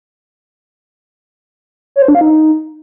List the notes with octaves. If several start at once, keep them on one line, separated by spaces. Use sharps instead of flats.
C#5
C5
D4
F5
D#4